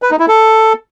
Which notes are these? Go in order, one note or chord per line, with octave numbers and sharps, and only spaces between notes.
B4
D#4
E4
A4